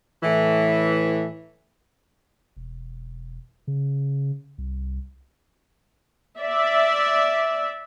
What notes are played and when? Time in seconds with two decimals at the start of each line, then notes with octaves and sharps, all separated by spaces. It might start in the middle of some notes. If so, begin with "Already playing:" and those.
0.23 A2 E3
2.57 E1
3.67 C#3
4.58 C2
6.39 D5 E5